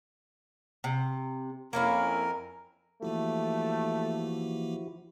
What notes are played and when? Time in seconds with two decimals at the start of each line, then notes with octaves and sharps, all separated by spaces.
0.84 C3
1.73 F2 A#3 C#4 E4 A#4
3.02 E3 F3 A3 A#3 E4 F#4 G4